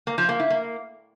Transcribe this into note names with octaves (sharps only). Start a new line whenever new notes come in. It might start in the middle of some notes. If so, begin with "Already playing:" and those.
A#3
F3
A#3
E4
A#3